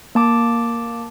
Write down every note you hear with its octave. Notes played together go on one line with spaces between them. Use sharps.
A#3 A5 D6